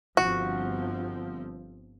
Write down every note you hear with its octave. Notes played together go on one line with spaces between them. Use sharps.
G1 F3 C4 F#4